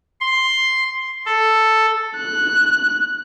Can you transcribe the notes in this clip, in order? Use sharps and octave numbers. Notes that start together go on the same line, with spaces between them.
C6
A4
F#6